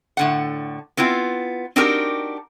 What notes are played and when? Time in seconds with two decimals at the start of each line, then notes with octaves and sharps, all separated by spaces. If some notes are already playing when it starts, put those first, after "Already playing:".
0.17 A2 D3 F#5
0.97 B3 C4 E4 F4
1.76 C4 D4 D#4 F#4 G4 A#4